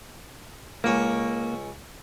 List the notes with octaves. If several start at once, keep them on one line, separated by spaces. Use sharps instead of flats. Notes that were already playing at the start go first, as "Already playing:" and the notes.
C#2 A#3 C#4